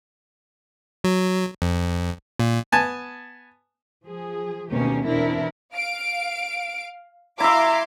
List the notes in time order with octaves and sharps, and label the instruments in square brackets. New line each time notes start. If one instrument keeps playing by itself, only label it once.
[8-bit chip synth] F#3
F2
A#2
[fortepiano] B3 G#5 A5
[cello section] F3 G#4
D2 B2 D#3 A#3 C#4 G4
E2 B2 C4 D4 E4 A#4
[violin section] F5 D7
[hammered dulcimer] E4 E5 [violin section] F5 C6 D6 [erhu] A#5